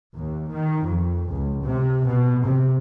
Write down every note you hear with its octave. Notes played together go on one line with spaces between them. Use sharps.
D#2
D#3
F2
C#2
C3
B2
C3